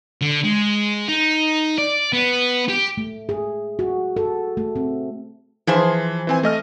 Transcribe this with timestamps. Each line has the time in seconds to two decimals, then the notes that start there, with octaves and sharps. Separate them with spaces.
0.21 D3
0.45 G#3
1.09 D#4
1.78 D5
2.13 B3
2.69 G4
2.97 A3
3.29 G#4
3.79 F#4
4.17 A4
4.57 A3
4.76 C4
5.67 E3 F3 G#4 C5
6.27 E3 C4 G#5
6.43 A3 D#5 F6